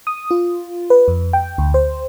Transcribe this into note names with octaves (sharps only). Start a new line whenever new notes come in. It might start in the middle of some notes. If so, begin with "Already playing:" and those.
D#6
F4
B4
F2
G5
D2
C5